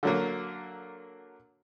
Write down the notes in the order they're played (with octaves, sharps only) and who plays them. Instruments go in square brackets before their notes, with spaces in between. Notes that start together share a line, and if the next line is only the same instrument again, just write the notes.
[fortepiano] D3 F#3 A#3